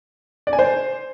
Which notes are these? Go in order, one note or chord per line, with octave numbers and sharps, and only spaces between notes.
D5
G#5
C5